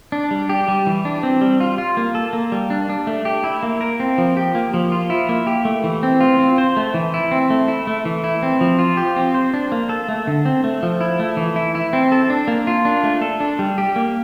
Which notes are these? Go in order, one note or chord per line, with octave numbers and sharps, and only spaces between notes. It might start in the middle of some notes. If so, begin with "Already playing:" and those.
D4
G3
G4
G3
E3
D4
C4
G3
F4
F4
A#3
A4
A#3
G3
D4
D4
A3
G4
E4
A#3
A#4
C4
F3
G4
A#3
F3
F4
E4
A#3
G4
A3
E3
C4
F4
C4
C5
A3
E3
E4
C4
A3
E4
A3
E3
E4
C4
F3
F4
G4
C4
C5
D4
A#3
A4
A3
D3
C4
A3
F3
E4
A3
E3
E4
E4
C4
A4
D4
A#3
F4
D4
A3
A4
D4
G3
G4
A#3